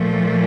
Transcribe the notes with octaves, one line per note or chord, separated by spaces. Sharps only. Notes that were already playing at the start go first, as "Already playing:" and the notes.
Already playing: A#2 F3 A3